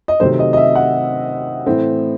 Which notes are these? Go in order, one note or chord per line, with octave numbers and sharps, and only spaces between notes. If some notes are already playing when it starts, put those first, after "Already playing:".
D#5
C3 D#3 F#3 A3 C4 C5
D#5
D#5
E5
F#5
A2 E3 A3 C4